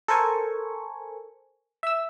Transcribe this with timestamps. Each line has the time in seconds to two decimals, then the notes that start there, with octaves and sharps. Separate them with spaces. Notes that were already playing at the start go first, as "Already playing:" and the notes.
0.08 A4 A#4 C5 G#5 C#6
1.83 E5 E6